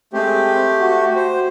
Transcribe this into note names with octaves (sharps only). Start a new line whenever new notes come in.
G#3 A3 C4 G4
F#4
C5